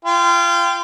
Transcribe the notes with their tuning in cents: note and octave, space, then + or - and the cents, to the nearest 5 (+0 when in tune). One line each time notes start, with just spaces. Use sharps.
F4 -25 G5 +0